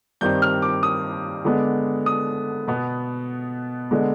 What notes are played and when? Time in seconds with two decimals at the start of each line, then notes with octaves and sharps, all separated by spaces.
0.21 G2 D#3 G3 C4 G6
0.42 F6
0.62 D6
0.83 D#6
1.45 D3 G#3 B3
2.06 D#6
2.68 B2 B3
3.91 D3 G#3 B3